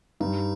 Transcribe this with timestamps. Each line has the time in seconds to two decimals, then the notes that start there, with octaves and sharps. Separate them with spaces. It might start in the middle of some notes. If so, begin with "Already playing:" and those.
0.20 G2 D#4